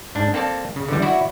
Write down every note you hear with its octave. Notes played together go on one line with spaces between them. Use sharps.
G#2 D4
A#3 C4 A4 D5 A5
C#3
D3 E3 G3
E4 F#4 D5 E5